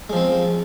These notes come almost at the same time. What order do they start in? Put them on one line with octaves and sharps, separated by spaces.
G#3 F3 C4